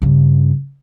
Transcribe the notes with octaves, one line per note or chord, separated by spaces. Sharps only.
G2 C#3